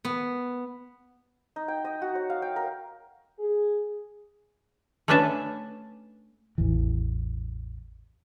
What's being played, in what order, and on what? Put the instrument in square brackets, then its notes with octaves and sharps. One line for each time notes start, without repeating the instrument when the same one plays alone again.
[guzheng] B3
[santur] D#4
G5
D#5
F#4
C#5
F5
G5
A#4
[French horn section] G#4
[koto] A3 C#4 D4 B4 E5 A5
[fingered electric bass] A1 E2 E3